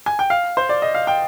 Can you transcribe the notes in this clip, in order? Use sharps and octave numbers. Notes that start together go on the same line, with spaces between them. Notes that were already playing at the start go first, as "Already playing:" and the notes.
G#5
G5
F5
C5
D5
D#5
F5
G5